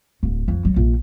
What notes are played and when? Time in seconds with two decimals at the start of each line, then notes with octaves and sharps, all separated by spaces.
0.23 D1
0.48 F2
0.65 F#3
0.76 A#1